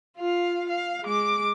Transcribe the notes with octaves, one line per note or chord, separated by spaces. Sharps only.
F4 F5
F5
G#3 D6